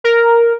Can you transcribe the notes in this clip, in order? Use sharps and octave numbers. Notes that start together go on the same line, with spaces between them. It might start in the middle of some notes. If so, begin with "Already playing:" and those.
A#4